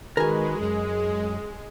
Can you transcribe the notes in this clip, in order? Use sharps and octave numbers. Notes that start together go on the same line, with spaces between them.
D#3 G#3 F#4 G#4 A#4 B4 G#5
F#2 G#4